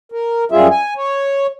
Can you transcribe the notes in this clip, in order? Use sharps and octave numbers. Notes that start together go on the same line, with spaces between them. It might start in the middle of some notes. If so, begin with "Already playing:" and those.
A#4
F#2 G3 F4 G#4 E5
G#5
C#5